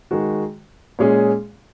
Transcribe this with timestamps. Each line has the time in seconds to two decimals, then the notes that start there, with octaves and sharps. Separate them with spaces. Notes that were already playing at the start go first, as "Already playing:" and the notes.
0.11 D#3 G#3 F#4
0.99 A#2 G#3 C#4 G#4